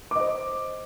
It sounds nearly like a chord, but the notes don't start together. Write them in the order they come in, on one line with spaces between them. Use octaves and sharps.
D6 D#5 C5